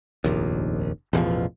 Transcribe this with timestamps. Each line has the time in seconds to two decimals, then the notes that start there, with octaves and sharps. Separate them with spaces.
0.24 F1 A#1 D#2
1.13 A1 E2 B2 F3